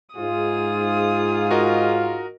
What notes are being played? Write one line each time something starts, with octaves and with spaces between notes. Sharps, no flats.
G#2 F4 G#4 D#6
F#4 A#4 D#5